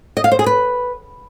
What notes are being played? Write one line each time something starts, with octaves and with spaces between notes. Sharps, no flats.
D#5
F5
C5
G#4
B4